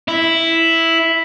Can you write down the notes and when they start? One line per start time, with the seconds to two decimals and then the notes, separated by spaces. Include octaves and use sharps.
0.08 E4